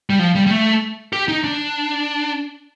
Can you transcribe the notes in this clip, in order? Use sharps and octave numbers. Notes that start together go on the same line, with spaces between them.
G3
F3
G3
G3
A3
G4
D#4
D4